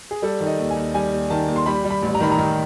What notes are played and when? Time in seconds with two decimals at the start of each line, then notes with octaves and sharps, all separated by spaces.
0.11 G#4
0.22 G3 A4
0.40 D#3
0.47 D#5
0.58 D#2
0.70 G#5
0.77 D#2
0.94 G3 G#5
1.13 D#2
1.30 D#3 A5
1.48 D#2
1.56 C6
1.66 G3 B5
1.84 G3
1.90 B5
2.02 A1
2.14 A#5
2.20 D#3 B5
2.31 A#5
2.38 D#3